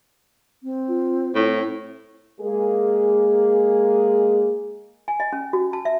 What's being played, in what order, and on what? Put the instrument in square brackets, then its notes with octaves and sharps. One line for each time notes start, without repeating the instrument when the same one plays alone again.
[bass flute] C4
[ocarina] F4
[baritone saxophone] A2 [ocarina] E4
[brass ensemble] G#3 A#3 G#4
[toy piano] G#5
D#5
C#4
F#4
A5
E5